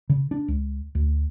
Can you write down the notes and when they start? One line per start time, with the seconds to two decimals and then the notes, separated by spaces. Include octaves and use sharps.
0.09 C#3
0.31 D4
0.48 C#2
0.95 D2